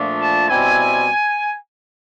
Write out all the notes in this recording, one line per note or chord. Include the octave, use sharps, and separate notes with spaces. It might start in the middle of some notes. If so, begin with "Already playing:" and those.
Already playing: A#2 F3 A3 D4
A5
B2 G3 C4 E4 G#5